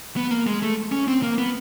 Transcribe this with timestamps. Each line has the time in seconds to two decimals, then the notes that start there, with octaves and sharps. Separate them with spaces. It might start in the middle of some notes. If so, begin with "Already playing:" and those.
0.17 B3
0.31 A#3
0.47 G#3
0.62 A3
0.92 C#4
1.08 C4
1.23 A#3
1.38 B3